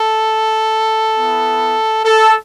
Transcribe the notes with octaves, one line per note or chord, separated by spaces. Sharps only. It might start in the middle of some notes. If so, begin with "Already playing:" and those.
Already playing: A4
B3 E4
A4